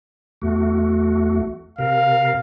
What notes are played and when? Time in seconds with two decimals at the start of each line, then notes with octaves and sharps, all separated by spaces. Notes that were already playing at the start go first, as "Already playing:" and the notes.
0.42 E2 A3 F#4
1.78 C3 A#4 F5